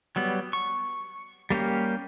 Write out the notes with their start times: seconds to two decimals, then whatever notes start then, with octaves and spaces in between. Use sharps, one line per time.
0.16 F#3 G3 B3
0.53 C#6
1.50 G3 A#3 C#4 G4